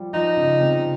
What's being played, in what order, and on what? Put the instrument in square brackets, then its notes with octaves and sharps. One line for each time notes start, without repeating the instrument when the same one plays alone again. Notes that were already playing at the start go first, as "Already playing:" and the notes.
Already playing: [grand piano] F3 G3
[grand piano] F3 [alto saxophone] D#4
[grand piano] C#3
C3